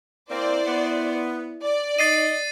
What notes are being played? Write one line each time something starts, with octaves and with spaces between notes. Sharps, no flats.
A#3 C4 E4 C5 D5
B3
D5
D#4 D#5 A6 C7 D#7